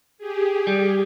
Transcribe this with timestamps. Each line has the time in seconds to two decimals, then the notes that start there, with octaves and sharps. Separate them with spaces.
0.18 G4 G#4
0.67 G3